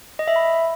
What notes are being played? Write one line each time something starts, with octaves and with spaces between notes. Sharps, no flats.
D#5
E5
B5